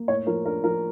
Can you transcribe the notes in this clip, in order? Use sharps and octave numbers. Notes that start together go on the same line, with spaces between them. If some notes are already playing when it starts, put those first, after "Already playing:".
Already playing: A#3
A2 C#5
F3 A#4
D4 A#4
F3 A#4